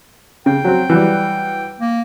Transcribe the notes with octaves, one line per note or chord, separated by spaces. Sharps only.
C#3 G5
F#3 C4
E3 F#3 G3
A#3